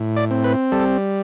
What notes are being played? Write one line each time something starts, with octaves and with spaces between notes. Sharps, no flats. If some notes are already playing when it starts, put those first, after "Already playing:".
Already playing: A2
D5
C4
B4
G3 A4